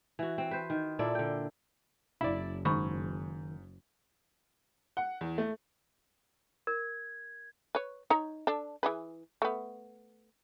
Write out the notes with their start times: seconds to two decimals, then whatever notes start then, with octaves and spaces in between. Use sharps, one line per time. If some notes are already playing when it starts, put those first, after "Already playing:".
0.19 E3 F#4
0.38 C4
0.51 B4 C5
0.70 D#3
0.99 A#2 E4 A4 D5
1.15 D3 G5
2.21 F#1 E4 D5
2.65 G#2 D#3 B5 C#6
4.97 F#5
5.21 E2
5.38 A3
6.67 A#4 G#6
7.75 B4 C#5
8.10 D#4 C#5 A#5
8.47 D4 A4
8.83 E3 G#4 B4
9.42 A3 B3